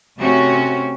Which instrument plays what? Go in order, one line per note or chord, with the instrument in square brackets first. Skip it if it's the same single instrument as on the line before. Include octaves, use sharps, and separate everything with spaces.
[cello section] C3 A3 C4 C#4 F#4